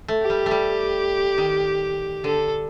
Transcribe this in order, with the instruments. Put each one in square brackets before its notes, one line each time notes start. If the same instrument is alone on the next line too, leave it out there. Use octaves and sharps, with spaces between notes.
[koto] A3
[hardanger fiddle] G4
[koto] G3
A3
G3
D#3
[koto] D3 [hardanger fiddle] A4